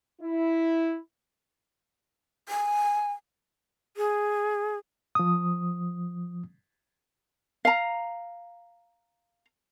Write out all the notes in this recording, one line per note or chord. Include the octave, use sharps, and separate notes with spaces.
E4
G#5
G#4
F3 D#6
F5 A#5